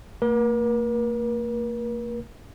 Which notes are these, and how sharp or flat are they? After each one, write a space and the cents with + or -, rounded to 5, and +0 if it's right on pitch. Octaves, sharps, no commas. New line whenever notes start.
A#3 -45 A#4 +45